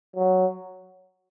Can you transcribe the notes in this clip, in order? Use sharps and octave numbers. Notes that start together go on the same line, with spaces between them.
F#3